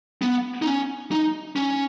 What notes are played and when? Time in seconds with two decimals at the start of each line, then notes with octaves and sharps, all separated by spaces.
0.22 B3
0.62 D#4
0.67 C#4
1.11 D#4
1.56 C#4